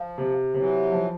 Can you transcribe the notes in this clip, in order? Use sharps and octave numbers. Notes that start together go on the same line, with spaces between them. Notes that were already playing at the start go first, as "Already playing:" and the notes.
Already playing: F3
C3
C3 E3 F#3
F3